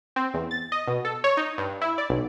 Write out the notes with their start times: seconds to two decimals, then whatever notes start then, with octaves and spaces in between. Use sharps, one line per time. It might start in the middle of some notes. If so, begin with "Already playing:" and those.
0.16 C4
0.34 E2
0.51 A6
0.72 D#5
0.87 B2
1.05 A4
1.24 C#5
1.37 D#4
1.58 G2
1.82 E4
1.98 D5
2.10 B1